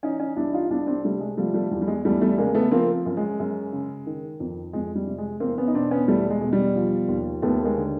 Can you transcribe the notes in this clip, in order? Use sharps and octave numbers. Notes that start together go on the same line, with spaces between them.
E3 C#4 D#4
C#4 D#4
C2 D4 E4
D#4 F4
C2 D4 E4
C4 D4
C3 G3 A3
G#3
F3 G3 A3
G3 A3
E2 G3
G3
G#3
E2 G3 A3
G3 A3
C#3 G#3 A#3
A3 B3
F3 A#3 C4
F#2
G#3
F#2
C#3
D#3
F2
F2 G#3
G3
C3
G#3
E2 A#3 C4
B3 C#4
D#4
B2 C4 D4
B3 C#4
E2 G3 A3
G#3
B2
G3
F3
D#2
D#2 A3 B3
G#3 A#3
D3